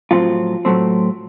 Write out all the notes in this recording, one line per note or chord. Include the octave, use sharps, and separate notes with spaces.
A2 F3 F#3 C4 F4
A2 F#3 A3 C4